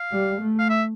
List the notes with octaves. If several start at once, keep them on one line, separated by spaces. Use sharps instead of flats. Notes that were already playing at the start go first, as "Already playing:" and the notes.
Already playing: F5
G3
A3
F5
E5